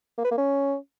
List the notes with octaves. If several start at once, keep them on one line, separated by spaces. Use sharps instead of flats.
A#3
B4
A#3
C#4